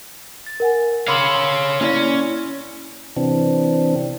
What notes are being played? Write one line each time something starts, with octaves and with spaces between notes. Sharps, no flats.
A6
A#4 F#5 G#5
C#5 F5 B5 C6 D6 E6 F#7
A#3 C#4 E4 D5
C3 E3 C4 D4